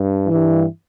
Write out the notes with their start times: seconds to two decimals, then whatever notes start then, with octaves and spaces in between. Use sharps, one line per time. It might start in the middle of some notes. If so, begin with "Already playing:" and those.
Already playing: G2
0.27 G2 E3